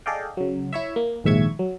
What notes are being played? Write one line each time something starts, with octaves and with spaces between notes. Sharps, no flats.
G#4 A4 D5 D#5 F5 G5
C#3 F#3
E4 C#5 E5
A#3
A#1 D#2 G#2 E5 C#6 G#6
F#3